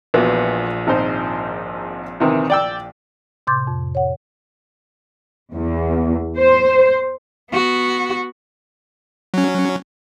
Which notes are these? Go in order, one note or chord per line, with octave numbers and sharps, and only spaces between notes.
A#1 A#2 E3 B3 F#4
G#1 D#4 C5
C3 D#3 E3
D5 G5 E6
A2 C3 C6 D6 G6 A6
F2
C#5 F#5
E2
C5
B3 F#4
F#3 C#4